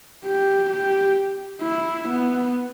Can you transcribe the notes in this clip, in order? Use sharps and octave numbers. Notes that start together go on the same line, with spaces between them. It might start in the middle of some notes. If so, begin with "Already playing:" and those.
G4
G4
E4
B3